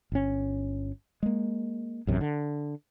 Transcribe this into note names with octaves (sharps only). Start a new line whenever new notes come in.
G1 C#4
G#3 A#3
A1 F#2 C3
D3